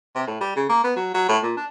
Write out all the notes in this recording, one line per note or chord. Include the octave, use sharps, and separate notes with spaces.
C3
A2
G3
C#3
A#3
B3
F#3
F#3
A2
A#2
D4